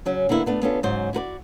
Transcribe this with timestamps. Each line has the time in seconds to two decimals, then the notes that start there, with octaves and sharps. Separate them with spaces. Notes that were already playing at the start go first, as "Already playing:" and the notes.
0.05 C#3 F#3 C#4
0.29 D3 A#3 B3 E4
0.46 A3 B3 D4
0.62 B3 C#4 D4 F4 A4
0.83 G#2 C#3 F#3 C5
1.13 E4 F#4 B4 D5